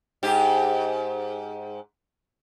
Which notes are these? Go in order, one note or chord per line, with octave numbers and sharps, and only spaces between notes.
G#2 G4